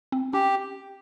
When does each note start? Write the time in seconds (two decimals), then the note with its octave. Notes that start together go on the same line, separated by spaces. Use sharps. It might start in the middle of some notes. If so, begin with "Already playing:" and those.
0.12 C4
0.33 C#4 G4